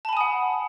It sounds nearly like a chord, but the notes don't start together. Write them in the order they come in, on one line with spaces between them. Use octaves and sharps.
A5 B5 G#5 D#6 F#5